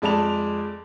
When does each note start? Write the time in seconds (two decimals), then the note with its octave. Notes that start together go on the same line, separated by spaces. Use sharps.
0.02 F2 G#3 D5 A5 B5 F7